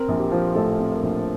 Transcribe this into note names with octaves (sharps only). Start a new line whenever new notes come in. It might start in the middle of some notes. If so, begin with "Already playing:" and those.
Already playing: C4 A#4
A#1
G4
F3
A2 A4
C4
A#4
A#1